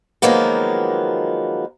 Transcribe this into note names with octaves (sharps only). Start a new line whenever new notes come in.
D#3 F3 F#3 G#3 A#3 B3